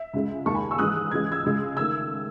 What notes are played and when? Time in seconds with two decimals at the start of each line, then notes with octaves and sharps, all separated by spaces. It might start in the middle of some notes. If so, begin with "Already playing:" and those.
Already playing: E5
0.14 C#2 C#3 G#3
0.46 D#2 D#3 G#3 A5 C#6
0.55 G#5 B5
0.71 C#6 E6
0.78 G#2 E3 G#3 D#6 F#6
1.11 C#2 C#3 E3 G#3 G#6
1.32 E6 G#6
1.45 C#2 C#3 G#3
1.76 D#3 A3 E6 G#6